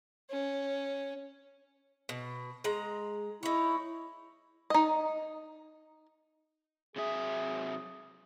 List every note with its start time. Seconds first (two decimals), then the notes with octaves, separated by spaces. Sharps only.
0.30 C#4
2.09 B2
2.64 G#3 A#5
3.43 D#4 E4 C#5
4.70 D#4 D#5
6.96 C3 F#3 G#4 E5